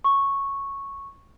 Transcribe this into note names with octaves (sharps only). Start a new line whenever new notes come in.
C#6